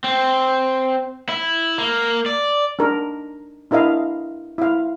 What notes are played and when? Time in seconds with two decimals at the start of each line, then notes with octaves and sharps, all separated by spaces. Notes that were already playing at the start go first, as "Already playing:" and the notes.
0.04 C4
1.29 E4
1.78 A#3
2.26 D5
2.79 D4 D#4 A#4
3.71 D4 E4 A#4 D#5 F5
4.58 E4 F5